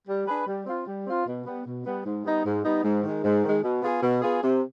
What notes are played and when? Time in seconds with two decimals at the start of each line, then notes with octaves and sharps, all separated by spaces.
0.08 G3
0.27 D4 G#4 B4
0.47 G3
0.66 C4 F4
0.87 G3
1.06 C4 F4
1.26 B2
1.46 G3 B3
1.66 B2
1.85 G3 B3
2.05 G#2
2.25 G3 B3 D#4
2.45 G#2
2.65 G3 B3 D#4
2.84 G#2
3.04 D#3 G#3
3.24 G#2
3.44 D#3 G#3
3.64 B2
3.83 B3 F4 G#4
4.03 B2
4.22 B3 F4 G#4
4.43 C3